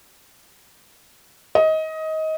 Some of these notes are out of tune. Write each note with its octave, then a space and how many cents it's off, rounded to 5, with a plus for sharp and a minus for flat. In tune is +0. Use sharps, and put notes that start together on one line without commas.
D#5 +20